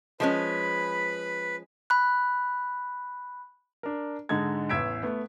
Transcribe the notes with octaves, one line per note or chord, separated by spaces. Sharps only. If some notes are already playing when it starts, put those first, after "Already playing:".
F3 G#3 C#4 B4 B5
B5 F#6
D4 A#4
G#2 D3 G#3 D#4 A4 G#6
A1 E2 E6 G#6 B6 D7
A3 B3